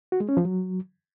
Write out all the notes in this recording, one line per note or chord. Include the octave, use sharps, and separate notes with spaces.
F#4
G#3
C#4
F3
F#3